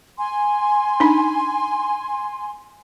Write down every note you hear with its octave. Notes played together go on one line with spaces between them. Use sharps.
G#5 C6
D4 D#4 B5